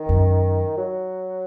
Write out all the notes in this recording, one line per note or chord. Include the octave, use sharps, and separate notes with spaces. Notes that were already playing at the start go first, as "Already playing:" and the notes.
Already playing: D#3
F#2
F#3